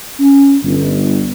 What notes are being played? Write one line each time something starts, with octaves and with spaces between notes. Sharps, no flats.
C#4
G1